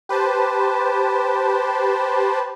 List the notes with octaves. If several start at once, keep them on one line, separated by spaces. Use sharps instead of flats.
G4 B4 C5 A5